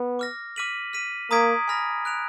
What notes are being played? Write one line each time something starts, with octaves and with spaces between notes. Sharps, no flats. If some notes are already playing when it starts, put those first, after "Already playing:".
Already playing: B3
D6 F6 A#6
D6 F6 B6 D#7 F#7
F6 B6 D#7
A#3 A#5 D#6 G#6 B6 D7
G#5 B5 F6 A#6
F#6 D7 F7